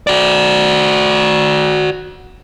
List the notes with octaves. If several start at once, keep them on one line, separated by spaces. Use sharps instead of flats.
F#4 D5